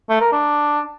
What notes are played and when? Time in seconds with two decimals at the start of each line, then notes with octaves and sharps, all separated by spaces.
0.09 A3
0.21 A#4
0.32 D4